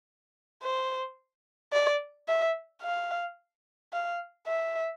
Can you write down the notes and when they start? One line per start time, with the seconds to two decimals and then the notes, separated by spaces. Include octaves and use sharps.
0.63 C5
1.73 D5
2.28 E5
2.82 F5
3.93 F5
4.47 E5